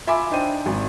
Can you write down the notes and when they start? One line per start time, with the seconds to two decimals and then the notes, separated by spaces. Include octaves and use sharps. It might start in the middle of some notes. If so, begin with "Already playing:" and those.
0.07 F4 E5 G#5 B5 D6
0.31 D4 D#4 C5 G5 D#7
0.66 G#1